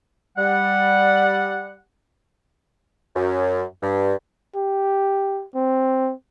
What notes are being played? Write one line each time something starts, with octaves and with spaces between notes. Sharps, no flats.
G3 F#5
F#2
G2
G4
C4